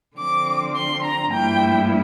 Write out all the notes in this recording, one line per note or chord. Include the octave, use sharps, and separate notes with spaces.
D3 F3 C4 D6
C6
A#5
G2 F3 A#3 E4 G5